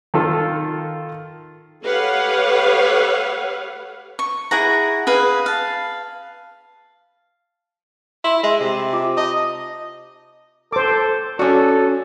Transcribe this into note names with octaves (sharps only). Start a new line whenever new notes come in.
D#3 F4 A4
G4 A4 B4 C#5 F5 F#5
C#6
E4 G#4 F#5 A#5
G#4 B4 F5
F5 A5
E4 C6
G#3 E5 C6
C3
F4 D6
D#5 A5
A4 C5 D6
C#4 F#4 A4 D5